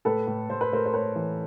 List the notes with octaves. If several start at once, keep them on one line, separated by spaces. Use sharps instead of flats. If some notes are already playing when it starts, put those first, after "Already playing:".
A2 A4 B4
A2
A2 C5
B4
A2 A#4 C5
C5
A3 B4 C#5
E3